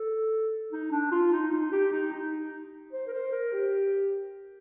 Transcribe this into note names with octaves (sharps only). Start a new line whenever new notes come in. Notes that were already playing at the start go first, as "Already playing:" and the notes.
Already playing: A4
D#4
D4
F4
D#4
D#4
G4
D#4
D#4
C5
A#4
C5
A#4
G4